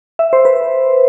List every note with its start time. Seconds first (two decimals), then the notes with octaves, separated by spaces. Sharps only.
0.19 E5
0.33 C5
0.45 B4